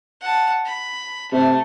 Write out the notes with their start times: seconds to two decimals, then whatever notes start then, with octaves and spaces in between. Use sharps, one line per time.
0.21 F#5 A5
0.65 B5
1.32 C3 A3